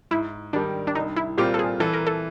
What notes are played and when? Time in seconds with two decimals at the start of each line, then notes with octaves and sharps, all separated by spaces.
0.11 G#2 E4
0.53 D#3 G3 D4
0.87 D4
0.95 C2 D#4
1.17 E4
1.37 A#2 G3 C4 F4 G4
1.54 A4
1.59 G#4
1.80 E3 A4
1.93 A#4
2.07 A4